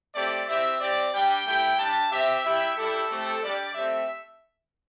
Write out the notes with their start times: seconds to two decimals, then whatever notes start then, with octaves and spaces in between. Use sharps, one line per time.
0.15 A3 C4 G4 D5
0.49 C4 E4 G4 E5
0.80 C4 G4 D5
1.13 G3 D4 G4 G5
1.46 A3 E4 G4 G5
1.78 G3 D4 G4 A5
2.11 C4 G4 E5
2.45 G3 E4 G4 E5
2.77 G3 E4 G4 A4
3.10 A3 C4 G4
3.43 G3 D4 G4 D5
3.74 A3 C4 G4 E5